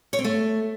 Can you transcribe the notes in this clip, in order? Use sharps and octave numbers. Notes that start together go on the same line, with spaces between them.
C#5
C4
A3